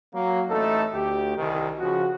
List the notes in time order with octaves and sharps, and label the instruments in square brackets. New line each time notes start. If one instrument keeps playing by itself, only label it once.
[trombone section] F#3 A#3
A1 A3 D#4 A4
D2 G4
C2 D#3
C#3 F3 F#4